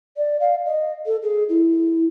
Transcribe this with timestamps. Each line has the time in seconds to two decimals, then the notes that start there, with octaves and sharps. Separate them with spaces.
0.16 D5
0.40 F5
0.65 D#5
1.06 A4
1.22 G#4
1.49 E4